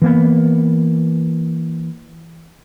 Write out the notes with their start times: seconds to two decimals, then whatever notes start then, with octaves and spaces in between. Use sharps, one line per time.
0.02 E3 A#3 B3